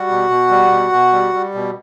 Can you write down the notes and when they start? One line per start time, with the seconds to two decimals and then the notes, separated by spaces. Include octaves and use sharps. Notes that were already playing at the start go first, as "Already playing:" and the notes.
Already playing: G3 F#4 F#5
0.10 B2
0.30 B2
0.51 G3
0.72 B2
0.93 B2
1.13 G3
1.34 G3
1.55 B2